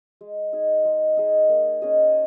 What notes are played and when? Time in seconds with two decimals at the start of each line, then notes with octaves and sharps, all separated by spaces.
0.21 G#3
0.53 D#4 G#4
0.85 G#3
1.17 D#4 G#4
1.49 A#3
1.82 C#4 G#4 D#5